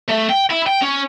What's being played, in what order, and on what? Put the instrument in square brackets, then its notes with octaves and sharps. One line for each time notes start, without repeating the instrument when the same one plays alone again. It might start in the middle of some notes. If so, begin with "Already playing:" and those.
[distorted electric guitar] A3
G5
E4
G5
C#4